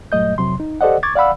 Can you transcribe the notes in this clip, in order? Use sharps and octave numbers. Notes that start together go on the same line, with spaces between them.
G2 A#2 F#3 A3 D#5 G6
F2 C3 F#3 C6
D#4
G4 A4 C5 D5 D#5 F#5
C#6 D6 G#6 A6
D5 F5 F#5 B5 E6